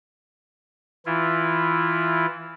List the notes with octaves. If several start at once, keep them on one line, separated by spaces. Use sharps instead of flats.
E3 E4 F4